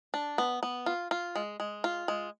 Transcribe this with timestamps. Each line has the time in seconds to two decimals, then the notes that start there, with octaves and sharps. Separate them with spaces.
0.14 D4
0.38 B3
0.63 B3
0.86 F4
1.11 F4
1.35 G#3
1.60 G#3
1.84 F4
2.08 G#3